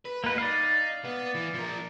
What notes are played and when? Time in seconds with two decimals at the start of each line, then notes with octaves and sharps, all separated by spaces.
0.05 B4
0.24 A#3 D#4 F#4 B4
0.38 D#4 D5 F5
1.05 B3
1.35 E3
1.54 F3 A#4